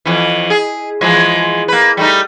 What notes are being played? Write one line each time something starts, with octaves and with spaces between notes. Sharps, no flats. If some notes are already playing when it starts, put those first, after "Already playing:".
F2 E3
G#4
E3 F3 G#3
A#3 B4
G3 A3 D#4